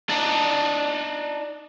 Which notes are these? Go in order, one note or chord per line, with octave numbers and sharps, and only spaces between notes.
D4 D#4